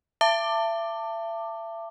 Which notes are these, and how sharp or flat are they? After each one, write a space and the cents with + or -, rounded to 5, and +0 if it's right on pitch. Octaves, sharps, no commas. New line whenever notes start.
E5 +35 A5 +25 D6 +10